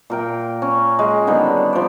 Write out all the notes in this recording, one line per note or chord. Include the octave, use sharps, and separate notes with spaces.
A#2 A#4 G5
C#4
G#3
D3 D#3 G3 B3
F3 D5